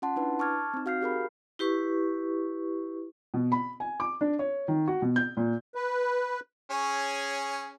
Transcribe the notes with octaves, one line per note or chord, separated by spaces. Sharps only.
C#4 F4 F#5 A5 C6
D4 E4 B4
A5 C#6 D6 F6 G#6 A6
C4 D#4
F#4 F5 F6 G6 C7
G4 G#4 A#4 B5
E4 G4 B4 C#6
B2
B5
G#5
D6
D4
C#5
D#3
F#4
B2
G6
A#2
B4
C#4 G#4 C#5